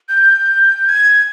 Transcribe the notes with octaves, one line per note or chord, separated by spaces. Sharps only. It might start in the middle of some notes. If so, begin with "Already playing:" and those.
G6
G#6